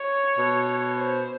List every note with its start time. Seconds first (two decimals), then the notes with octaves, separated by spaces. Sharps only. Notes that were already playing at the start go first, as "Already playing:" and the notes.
Already playing: C#5
0.38 B2
0.97 C5